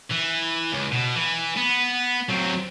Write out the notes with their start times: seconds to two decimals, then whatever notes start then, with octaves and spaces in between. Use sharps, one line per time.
0.10 E3
0.72 C#2
0.92 B2
1.16 E3
1.57 B3
2.29 F#3 C4